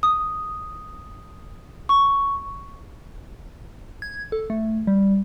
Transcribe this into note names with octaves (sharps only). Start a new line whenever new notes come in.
D#6
C#6
G#6
A4
A3
G3